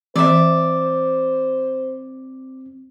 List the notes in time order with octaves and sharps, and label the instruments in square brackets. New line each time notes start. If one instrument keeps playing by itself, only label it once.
[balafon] E3 [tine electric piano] C4 [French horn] C5 [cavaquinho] D5 E5